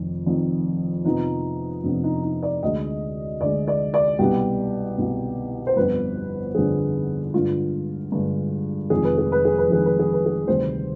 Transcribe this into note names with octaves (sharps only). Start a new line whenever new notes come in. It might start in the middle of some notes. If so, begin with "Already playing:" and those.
Already playing: F1 F2 D#3
F1 F2 D#3
F2 C3 F3 B3 D#4
F2 C3 F3 B3 D4
D#4
D#4
D5
D2 D3 G#3 D#5
D2 D3 G#3 D5
D5
D5
C2 B2 G3 B3 G4
C2 B2 G3 B3
C5
G1 F2 D3 G3 B3 B4
G1 F2 D3 G3 B3 G#4
G2 D3 G#3 F4
G2 D3 G#3
F1 F2 D#3 G#3 G#4
B4
G#4
B4
G#4
B4
F1 F2 D#3 G#3 G#4
B4
G#4
B4
G#4
D2 C3 D#3 G3 C5